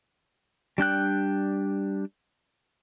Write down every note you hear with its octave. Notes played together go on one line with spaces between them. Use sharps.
G3 D4 G5 F#6